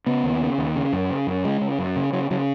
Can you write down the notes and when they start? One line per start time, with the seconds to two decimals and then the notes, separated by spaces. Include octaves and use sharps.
0.06 C#3 B3
0.23 D#2
0.41 C#3
0.58 D#2
0.76 C#3
0.93 F#2
1.10 C#3
1.27 F#2
1.44 C#3 G#3
1.61 C#3
1.79 F#2
1.96 C#3
2.13 C#3 F#3
2.31 C#3 F#3